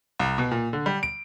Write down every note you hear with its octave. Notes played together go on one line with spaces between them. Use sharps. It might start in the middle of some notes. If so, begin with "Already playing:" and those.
C2
B2
A#2
D3
G3
D7